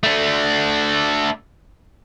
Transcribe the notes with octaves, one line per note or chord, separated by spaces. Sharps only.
A3 D4